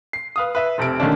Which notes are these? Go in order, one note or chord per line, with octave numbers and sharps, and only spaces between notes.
C7
B4 F5 D#6
B4 E5
F1 C3 A4 D7
D3 D#3 A3 A#3 C#4 D4